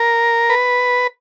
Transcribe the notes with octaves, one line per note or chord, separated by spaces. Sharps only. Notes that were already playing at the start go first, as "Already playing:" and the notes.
Already playing: A#4
B4